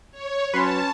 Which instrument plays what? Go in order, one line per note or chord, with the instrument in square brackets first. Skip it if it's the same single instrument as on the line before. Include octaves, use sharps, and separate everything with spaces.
[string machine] C#5
[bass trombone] F#3 [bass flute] C#4 [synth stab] B4 B5 C6 [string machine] A5